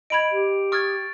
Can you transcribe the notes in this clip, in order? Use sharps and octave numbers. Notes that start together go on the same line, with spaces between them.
D#5 B5 G#6 D7 F7
G4
C#6 D#6 F6 G#6 A6